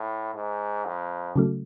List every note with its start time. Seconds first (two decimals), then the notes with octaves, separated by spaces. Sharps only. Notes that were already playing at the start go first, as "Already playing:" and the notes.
Already playing: A2
0.35 G#2
0.85 F2
1.36 C#3 F#3 A3